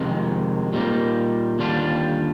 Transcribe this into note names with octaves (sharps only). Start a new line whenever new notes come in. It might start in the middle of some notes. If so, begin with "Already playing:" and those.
Already playing: F2 C3 D#3 G#3
A#2 G3 A#3 D#4
D#2 D3 G3 D4 F4